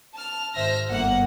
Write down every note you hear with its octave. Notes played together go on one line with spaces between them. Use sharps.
A5 F6
G#1 C5 E5 F6 A#6
G1 A#3 F#5